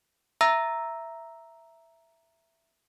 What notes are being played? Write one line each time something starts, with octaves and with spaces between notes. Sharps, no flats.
E5 A#5 E6 A#6